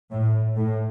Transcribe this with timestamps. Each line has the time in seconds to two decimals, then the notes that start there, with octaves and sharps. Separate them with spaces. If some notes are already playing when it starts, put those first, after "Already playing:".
0.11 A2
0.57 A2